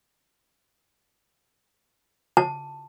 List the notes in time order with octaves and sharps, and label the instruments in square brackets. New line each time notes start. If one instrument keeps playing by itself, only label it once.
[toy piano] A5